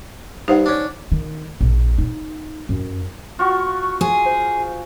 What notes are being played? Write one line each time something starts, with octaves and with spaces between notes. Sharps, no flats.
G2 D#4 C5 F#5
C#4 D4
D#3
A#1
D#4
F#2
F4 F#4 C#6
G#4
C5